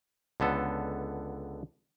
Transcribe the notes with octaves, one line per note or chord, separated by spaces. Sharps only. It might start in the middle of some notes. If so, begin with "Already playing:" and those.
C#2 D3 B3 A4